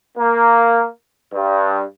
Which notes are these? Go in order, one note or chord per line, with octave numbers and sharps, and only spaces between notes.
A#3
G2